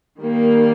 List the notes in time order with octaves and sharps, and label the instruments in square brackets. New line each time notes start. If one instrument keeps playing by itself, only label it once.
[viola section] D#3 G3 A#3